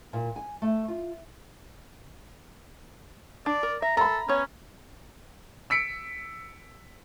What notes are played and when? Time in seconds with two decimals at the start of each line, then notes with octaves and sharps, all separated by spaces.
0.13 A#2
0.36 G#5
0.62 A3
0.88 F4
3.46 D4 D5
3.63 A#4
3.82 E5 A#5
3.97 A4 A#5 B5
4.28 B3 C#4 C#5
5.70 E6 B6 C#7 D7